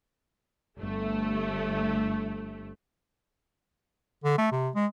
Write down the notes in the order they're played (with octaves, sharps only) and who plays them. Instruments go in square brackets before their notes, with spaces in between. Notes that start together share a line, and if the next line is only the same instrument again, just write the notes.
[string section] G1 A3
[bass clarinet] D3
A3
C3
G#3